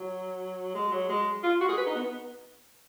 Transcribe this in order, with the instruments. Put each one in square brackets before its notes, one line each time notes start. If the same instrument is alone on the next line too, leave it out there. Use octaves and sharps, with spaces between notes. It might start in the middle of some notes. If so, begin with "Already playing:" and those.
Already playing: [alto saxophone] F#3
G#3
F#3
G#3
F4
F#4
G#4
B4
D#4
B3